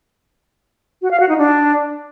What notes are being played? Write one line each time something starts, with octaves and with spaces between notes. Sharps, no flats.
F#4
F5
F#4
D#4
D4